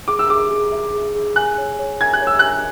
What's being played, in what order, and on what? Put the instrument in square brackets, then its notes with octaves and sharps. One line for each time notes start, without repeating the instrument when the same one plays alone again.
[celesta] G#4 [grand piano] D6
[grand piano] E6
[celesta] G#4 [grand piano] D6
[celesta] G#4
E5
G#4
G#4
[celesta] G#5 [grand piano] F#6
[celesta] C#5
C#5
[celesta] G#5 [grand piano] G#6
[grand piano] F#6
[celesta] C#5
[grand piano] E6
[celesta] G#5 [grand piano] F#6